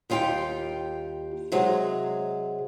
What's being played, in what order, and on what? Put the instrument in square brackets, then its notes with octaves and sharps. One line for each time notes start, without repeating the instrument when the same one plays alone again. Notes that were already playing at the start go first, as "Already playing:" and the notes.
[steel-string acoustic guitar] D#2 G3 F4 G4 G5
C3 F#3 G#3